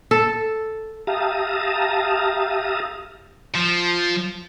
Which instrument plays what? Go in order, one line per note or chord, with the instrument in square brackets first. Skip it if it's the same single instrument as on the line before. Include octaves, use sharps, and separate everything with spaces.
[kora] A4
[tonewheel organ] G4 E5 F5 A5 A#5 D#6
[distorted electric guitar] F3